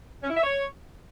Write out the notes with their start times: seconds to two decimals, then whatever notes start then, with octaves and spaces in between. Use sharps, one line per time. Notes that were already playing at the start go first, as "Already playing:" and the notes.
0.23 C#4
0.30 E4
0.37 E5
0.44 C#5